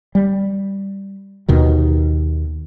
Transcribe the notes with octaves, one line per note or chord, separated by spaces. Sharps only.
G3
D#2 B2 D#3